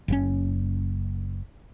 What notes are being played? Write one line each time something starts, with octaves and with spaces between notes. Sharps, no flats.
F#1 A2 C#4